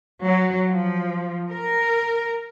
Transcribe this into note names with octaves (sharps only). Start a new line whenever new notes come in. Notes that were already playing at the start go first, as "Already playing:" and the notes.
F#3
F3
A#4